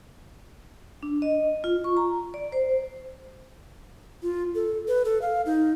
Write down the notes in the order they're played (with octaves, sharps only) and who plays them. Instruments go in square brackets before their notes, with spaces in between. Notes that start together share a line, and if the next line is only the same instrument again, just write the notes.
[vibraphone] D4
D#5
F4
C#6
A#5
D5
C5
[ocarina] F4
A4
B4
A4
F5
D#4